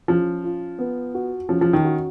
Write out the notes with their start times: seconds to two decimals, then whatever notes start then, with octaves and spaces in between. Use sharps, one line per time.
0.08 F3 C#4
0.44 F4
0.79 B3
1.15 F#4
1.49 F3 C#4
1.61 F3
1.73 D#3
1.85 F#4